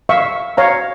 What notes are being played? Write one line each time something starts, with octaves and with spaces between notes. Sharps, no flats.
E5 F5 C#6
C#5 F5 A#5